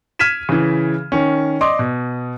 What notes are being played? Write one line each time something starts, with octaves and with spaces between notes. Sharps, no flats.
F6 G#6 B6 D#7 E7
C#3 E3
D#3 C#4
D5 D#5 C6 D6 D#6
B2